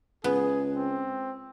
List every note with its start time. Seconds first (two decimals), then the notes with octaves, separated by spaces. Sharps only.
0.24 C#2 B3 G#4
0.75 C4